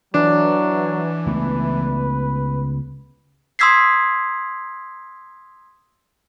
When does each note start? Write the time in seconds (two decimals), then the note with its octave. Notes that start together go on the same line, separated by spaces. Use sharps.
0.14 E3 F#3 D4
1.26 C#2 A3 B3 B4
3.59 C6 D#6 E6 G#6 B6 C7